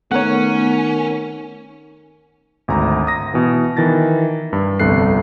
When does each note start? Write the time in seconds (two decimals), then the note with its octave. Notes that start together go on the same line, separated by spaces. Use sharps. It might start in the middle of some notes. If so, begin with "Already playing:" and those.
0.12 D#3 A3 B3 C#4 A#4 C#5 F#5
2.68 G#1 D2 A#5
3.07 D#6 A#6
3.34 B2 E3
3.77 D#3 E3 A5 A6 A#6
4.53 G2
4.80 G1 C2 F2 A4 F#6 C7